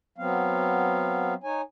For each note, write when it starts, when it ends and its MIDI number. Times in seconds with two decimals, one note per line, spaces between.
0.18 1.34 54
0.18 1.34 59
0.18 1.34 60
0.18 1.34 77
1.44 1.61 63
1.44 1.61 73
1.44 1.61 80